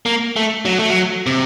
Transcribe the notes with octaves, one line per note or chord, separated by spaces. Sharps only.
A#3
A3
F#3
A3
F#3
C3